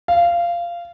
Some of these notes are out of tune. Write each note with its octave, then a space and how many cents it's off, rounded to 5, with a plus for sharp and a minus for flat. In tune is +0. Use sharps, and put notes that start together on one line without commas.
F5 -15